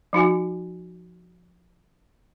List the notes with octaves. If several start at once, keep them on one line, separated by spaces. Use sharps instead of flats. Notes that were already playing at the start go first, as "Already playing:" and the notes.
F3 D#4 F#4 G#5